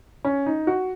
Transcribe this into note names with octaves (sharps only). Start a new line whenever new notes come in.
C#4
D#4
F#4